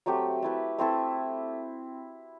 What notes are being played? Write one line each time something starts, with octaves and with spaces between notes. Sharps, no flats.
F#3 A3 C4 G4
A3 E4 B4
A3 C4 E4 A4